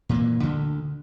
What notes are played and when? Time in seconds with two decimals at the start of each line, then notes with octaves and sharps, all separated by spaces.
0.09 A#2 E3 A#3
0.42 D2 D3